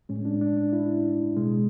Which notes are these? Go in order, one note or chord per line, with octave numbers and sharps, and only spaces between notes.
A2 G#3 C#4
D4
D4
D4
E4
B2 G#3